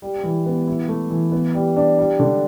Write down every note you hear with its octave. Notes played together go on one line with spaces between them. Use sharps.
G3
E3
B3
E4
A3
E3
B3
G3
D4
G3
D3